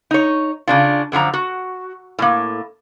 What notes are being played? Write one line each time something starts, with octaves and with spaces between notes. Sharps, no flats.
D#4 C#5
C#3 D4 F4
F#2 D3 F3 A#5
F#4
A2 A#3